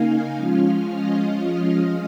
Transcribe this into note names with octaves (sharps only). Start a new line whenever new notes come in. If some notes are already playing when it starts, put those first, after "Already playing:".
Already playing: C#3 A#3 D#4 F5 G#5
F3 G#3 C#4 F4 F5
D#5